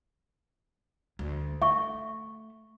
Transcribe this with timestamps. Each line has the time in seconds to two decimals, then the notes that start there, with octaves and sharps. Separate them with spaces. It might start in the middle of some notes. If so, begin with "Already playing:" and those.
1.19 D2
1.62 A3 E5 C#6